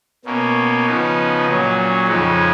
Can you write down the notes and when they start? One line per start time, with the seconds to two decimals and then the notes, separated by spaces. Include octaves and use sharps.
0.25 B2 A#3 C#4
0.85 C#3 F3 B3 D#4
1.47 A#2 F#3 C#4
2.07 F2 C#3 F3 G#3 D#4